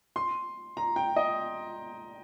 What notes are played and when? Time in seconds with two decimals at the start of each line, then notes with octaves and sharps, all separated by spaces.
0.16 C6
0.77 A#5
0.96 G5
1.16 D#5